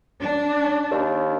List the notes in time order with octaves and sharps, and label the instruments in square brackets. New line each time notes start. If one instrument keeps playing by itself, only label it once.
[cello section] D4
[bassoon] D#2